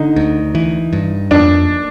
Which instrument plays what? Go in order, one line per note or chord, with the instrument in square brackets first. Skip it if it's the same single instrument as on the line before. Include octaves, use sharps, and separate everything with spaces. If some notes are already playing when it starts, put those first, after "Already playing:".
Already playing: [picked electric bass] D3 [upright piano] D#4
[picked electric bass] D2
E3
G2
[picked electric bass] F2 [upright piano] D4